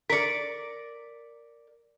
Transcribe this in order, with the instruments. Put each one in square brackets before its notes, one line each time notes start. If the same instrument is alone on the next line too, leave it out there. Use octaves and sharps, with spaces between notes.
[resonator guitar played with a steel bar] A#4 D5 [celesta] B6 C#7